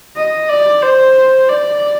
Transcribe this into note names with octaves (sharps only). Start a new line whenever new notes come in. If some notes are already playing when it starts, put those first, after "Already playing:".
D#5
D5
C5
D5